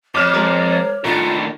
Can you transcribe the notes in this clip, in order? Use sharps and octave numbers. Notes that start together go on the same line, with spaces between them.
F2 C#5 D6 F6 E7
G#3 A#4 C5
D#2 A2 D4 F4 A#4